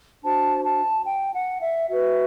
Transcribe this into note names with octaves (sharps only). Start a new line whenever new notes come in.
D4 F#4 C5 A5
A5
G5
F#5
E5
F#4 B4 E5